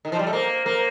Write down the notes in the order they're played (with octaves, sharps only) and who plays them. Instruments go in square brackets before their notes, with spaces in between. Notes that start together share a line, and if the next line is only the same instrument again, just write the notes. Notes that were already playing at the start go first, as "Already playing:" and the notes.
[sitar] D#3
F3
G3
A3
[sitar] A#3 [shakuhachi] C5
[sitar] A#3